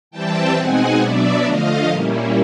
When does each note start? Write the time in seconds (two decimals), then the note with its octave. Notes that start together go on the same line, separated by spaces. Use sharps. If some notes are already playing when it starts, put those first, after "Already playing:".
0.11 E3 G3 C4 E4 G5 A5
0.55 B2 G#3 C4 D#4 F#5 G#5
0.99 B2 F#3 B3 D4 D5 E5
1.44 D3 F3 A3 D#5 F5
1.88 A#2 G3 A#3 C#4 E4